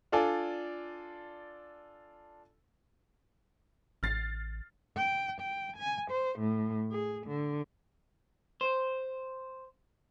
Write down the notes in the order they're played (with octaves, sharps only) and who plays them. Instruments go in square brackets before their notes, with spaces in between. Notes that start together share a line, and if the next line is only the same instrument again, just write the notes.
[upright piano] D4 F4 A4 D5 G#5
[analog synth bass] A1 [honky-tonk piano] F6 A6 C7
[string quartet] G5
G5
G#5
C5
A2
G#4
D3
[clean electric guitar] C5